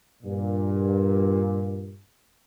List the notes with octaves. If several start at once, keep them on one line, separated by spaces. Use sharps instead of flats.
G2 A#2